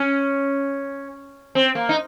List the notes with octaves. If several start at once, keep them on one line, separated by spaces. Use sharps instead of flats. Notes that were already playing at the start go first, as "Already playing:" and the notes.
Already playing: C#4
C4
A#3
D#4